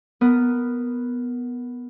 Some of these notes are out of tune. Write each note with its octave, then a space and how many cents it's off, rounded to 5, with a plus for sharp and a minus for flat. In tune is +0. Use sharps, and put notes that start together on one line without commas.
B3 +0 A#4 +0